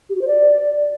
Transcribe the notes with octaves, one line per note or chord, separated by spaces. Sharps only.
G4
F#4
C5
D5